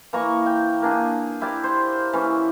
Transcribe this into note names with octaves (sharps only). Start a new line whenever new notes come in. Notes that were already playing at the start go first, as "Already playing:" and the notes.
E3 A#3 A#5 C#6
G5
A#3 D4 G#4
E4 G4 A#4 D5
C5
E3 C#4